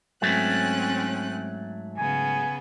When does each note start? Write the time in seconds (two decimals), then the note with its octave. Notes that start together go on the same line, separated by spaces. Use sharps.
0.22 G#2 F#3 A3 C4 C#4 F#6
1.97 C#3 B3 G#5